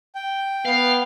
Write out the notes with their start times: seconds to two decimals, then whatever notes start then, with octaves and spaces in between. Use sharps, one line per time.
0.15 G5
0.66 B3 F5